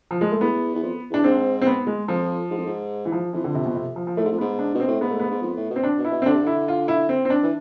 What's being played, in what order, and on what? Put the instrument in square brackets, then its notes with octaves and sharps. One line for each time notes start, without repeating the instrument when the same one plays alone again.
[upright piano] F3
G#3
A3
[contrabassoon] E2 [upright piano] B3
[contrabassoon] E2
F2
[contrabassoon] E2 [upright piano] D4
[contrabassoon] G#2 [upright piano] C4
[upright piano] C4
B3
G#3
[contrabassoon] F2 [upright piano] F3
[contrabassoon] G#2
F2
G#2
[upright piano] E3
F3
[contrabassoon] F2 [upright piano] E3
[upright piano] D3
C3
B2
C3
F3
F3
[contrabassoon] A2 [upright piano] A3
[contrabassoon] G#2
F2
[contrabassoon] G#2 [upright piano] B3
[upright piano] D4
[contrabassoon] B2
[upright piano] C4
[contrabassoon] A2
[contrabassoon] G#2 [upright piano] B3
[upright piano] A3
B3
[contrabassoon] G#2
F2
A2
B2
[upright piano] C4
D4
[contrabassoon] B2
[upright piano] E4
[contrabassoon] B2
[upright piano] C4
[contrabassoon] D3 [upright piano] D4
[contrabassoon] C3
[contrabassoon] D3 [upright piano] E4
[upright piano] F4
E4
C4
C4
D4
[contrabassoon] E3